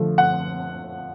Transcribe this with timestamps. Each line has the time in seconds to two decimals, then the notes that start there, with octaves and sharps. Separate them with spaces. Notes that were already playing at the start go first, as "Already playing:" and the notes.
Already playing: D3 F3 A3
0.18 F#5